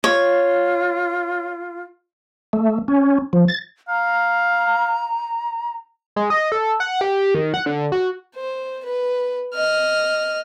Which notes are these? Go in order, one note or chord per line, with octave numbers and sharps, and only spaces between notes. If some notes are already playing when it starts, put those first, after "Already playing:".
F4 C#5
A3
C#4
F3
A6
F5 A#5
G#3
D#5
A4
F#5
G4
D#3
F#5
D3
F#4
C5
B4
D#5 F6